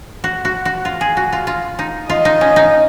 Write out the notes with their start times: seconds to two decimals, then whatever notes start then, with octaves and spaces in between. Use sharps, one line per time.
0.24 F#4
0.45 F#4
0.65 F#4
0.85 F4
1.01 G#4
1.17 F#4
1.32 F4
1.47 F4
1.79 D#4
2.09 F4 D#5
2.25 D#4
2.41 C#4
2.56 D#4